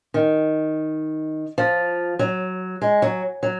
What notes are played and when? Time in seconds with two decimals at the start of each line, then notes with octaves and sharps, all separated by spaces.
0.14 D#3
1.58 F3
2.19 F#3
2.82 G#3
3.02 F#3
3.43 F#3